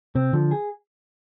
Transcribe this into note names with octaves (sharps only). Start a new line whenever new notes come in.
C3 C4
D3 F3
G#4